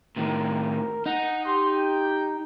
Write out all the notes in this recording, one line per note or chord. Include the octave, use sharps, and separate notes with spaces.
A2 D#3 A#4
D#4 F#5
G4 C6
G5